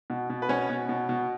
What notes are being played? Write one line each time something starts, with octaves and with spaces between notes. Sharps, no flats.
B2
B2
B4
B2 C#4 C#5
B2
B2
B2